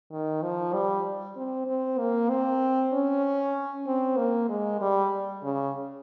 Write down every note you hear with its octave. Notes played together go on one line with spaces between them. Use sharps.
D#3
F3
G3
C4
C4
A#3
C4
C#4
C4
A#3
G#3
G3
C#3